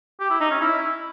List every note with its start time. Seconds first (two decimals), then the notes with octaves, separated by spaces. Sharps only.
0.20 G4
0.30 E4
0.40 D#4
0.51 C#4
0.61 E4